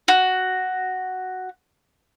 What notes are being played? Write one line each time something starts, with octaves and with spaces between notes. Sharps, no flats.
F#4